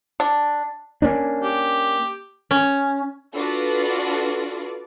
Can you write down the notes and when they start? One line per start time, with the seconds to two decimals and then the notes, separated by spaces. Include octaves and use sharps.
0.20 D4
1.02 A#3 C#4 D4
1.43 G4
2.51 C#4
3.35 D4 F4 F#4 A4 B4 D5